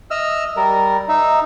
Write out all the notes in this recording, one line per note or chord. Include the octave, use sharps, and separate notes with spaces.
D#5 E5 E6 F6
G3 A#4
D#4 E5